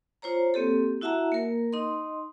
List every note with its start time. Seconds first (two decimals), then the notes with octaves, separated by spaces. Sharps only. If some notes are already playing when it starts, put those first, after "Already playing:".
0.22 F4 C5 C#5 A#5
0.54 A#3 C4 G4 A4
1.01 E4 F#4 E5 F#5 A5 A#5
1.32 A#3 A#4
1.73 D#4 D#5 C6